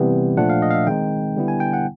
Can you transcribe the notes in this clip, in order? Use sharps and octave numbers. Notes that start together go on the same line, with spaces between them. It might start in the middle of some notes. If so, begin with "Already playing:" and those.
Already playing: C3 E3 G3 B3 G5
A#2 F3 A3 D4 F#5
F5
D#5
F5
E5
D#3 G#3 C4 D#4 G5
D3 G3 B3 E4
G#5
G5
F#5